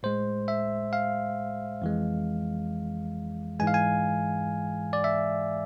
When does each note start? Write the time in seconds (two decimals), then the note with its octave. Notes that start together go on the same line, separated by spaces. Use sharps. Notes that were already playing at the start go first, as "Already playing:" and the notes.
0.03 A2 G#3 C5
0.48 E5
0.93 F5
1.82 F2 E3 G#3
3.60 G#2 E3 G#3 G#5
3.67 F5
3.74 G#5
4.93 D5
5.04 E5